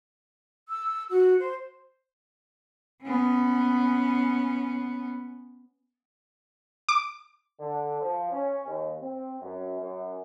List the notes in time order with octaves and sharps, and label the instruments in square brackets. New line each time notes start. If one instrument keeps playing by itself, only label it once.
[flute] E6
F#4
C5
[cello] B3 C#4
[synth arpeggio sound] D6
[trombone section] D3
F3
C#4
D#2
C4
F#2
F#2